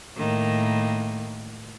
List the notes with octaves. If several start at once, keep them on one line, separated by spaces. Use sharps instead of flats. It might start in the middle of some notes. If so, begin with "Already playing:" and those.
A2 D#3 A#3